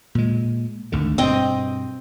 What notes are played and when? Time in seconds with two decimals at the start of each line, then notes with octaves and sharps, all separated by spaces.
0.15 A#2 G#3
0.92 G#1 D2 D3
1.18 G2 B2 C4 D#5 G5